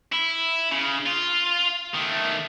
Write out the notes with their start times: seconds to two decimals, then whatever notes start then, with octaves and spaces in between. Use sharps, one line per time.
0.12 E4
0.72 C#3
1.06 F4
1.94 D#3 A3